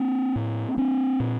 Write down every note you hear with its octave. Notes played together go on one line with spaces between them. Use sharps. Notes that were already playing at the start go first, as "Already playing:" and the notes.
Already playing: A#3 C4
A2
C4 D4
A#2